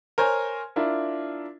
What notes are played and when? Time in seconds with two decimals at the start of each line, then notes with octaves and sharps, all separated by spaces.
0.18 A#4 C5 C#5 G#5
0.76 D4 E4 F4 A#4